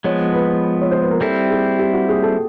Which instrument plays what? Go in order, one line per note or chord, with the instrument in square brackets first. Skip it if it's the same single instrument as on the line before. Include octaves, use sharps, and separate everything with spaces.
[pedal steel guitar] F3 G#3 B3 [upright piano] C#5
[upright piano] B4
C#5
C5
B4
A#4
[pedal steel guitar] G3 C4 E4 [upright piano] A4
[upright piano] G#4
G4
F#4
G#4
A4